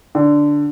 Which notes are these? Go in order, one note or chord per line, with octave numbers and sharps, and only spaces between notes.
D3